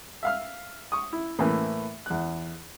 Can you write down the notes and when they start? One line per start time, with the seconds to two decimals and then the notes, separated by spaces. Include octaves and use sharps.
0.23 E5 F5 F6
0.92 C#6 D#6
1.13 E4
1.39 A2 E3 A#3
2.06 E2 F#6